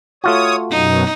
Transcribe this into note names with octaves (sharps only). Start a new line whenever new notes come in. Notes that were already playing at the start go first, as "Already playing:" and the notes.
A3 F4 F#4 C#5 D#6
F#2 B2 F#3 D#4